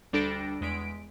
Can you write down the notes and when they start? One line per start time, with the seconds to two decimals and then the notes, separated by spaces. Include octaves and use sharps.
0.13 D2 G3 D4 A4 A#6 D7
0.61 E2 G#3 B6 D7